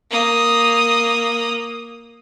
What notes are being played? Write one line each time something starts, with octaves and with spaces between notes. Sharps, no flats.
A#3 D#6